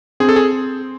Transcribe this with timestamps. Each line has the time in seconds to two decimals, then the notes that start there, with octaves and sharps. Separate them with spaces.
0.20 C4 G#4
0.29 A4
0.36 G#4